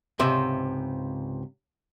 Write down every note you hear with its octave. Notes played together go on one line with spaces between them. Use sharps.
C#2 G#2 C3 E5